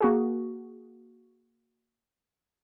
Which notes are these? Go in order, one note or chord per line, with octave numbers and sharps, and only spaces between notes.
A#3 F#4 G#4